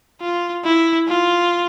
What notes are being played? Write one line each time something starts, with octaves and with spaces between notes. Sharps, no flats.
F4
E4
F4